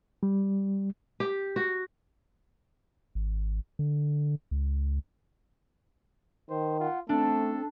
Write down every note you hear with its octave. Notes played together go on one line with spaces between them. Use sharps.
G3
G4
F#4
G#1
D3
C#2
D#3 C5
F4 F#5
A3 C4 D4 A4